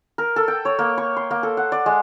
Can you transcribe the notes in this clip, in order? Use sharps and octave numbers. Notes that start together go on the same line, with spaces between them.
A#4
A4
G5
C#5
A#3
C#6
C6
A#3
A4
F#5
D5
G#3